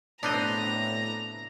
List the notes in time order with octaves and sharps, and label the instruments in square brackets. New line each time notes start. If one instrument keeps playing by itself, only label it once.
[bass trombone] A2 [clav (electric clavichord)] B3 C4 D#5 [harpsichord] D4 [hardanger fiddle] A#5